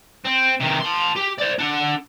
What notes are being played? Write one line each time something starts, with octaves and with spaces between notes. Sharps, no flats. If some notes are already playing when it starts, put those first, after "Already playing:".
C4
C3 D#3
A5 C6
G4
C5 D5
D4 F#5